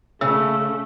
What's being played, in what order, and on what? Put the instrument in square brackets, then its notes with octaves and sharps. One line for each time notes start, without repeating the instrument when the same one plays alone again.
[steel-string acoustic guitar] C#3 [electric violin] A3 [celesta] E6